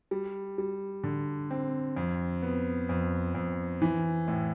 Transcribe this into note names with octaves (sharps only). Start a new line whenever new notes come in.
G3
G3
D3
C4
F2
B3
F2
F2
E3
A2